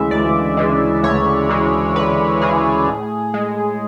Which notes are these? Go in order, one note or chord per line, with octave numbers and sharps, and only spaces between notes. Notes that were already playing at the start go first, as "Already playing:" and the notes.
Already playing: D2 C#3 E3 G#3 E5
D2 D5
C#3 E3 G#3
D2 C#5
C#3 E3 G#3
D2 B4
C#3 E3 G#3 G#4
A2
G#3